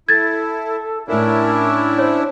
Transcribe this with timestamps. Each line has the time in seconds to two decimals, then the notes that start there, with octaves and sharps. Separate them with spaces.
0.09 E4 A4 G#6 A6
1.08 A2 C#4 D4 E4 A#4 E5
1.98 C5 C#5